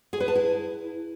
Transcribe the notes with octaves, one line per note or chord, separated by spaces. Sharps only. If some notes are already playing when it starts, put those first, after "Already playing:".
G#4
B4
A5
E4